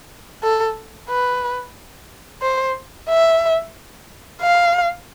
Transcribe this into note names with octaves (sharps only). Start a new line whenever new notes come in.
A4
B4
C5
E5
F5